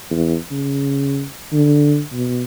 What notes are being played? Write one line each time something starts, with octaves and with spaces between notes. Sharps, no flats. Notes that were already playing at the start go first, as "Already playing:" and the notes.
E2
C#3
D3
B2